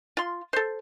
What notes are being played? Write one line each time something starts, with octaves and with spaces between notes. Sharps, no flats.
F4 C6
A4 C5